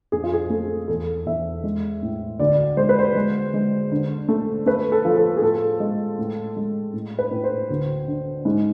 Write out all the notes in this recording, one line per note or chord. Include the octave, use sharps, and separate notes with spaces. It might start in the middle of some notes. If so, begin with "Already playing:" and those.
F2 G#4
F4
G#4
A3 A4
E2 A4
E2 E5
G#3
A2
D2 D5
G#3 C5
B4
C5
G#3
G#3
D3
A3
A3 B4
A4
F3
A4
G#4
A2 A4
G#3
A2
G#3
A2
B4
A2
C5
D2
D3
G#2